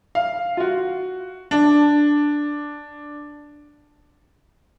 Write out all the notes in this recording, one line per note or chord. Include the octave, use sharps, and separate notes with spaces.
F5
F4
F#4
D4